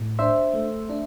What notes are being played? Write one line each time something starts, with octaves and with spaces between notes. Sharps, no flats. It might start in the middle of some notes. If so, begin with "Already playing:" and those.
Already playing: A2
D4 C5 E5
A3
D4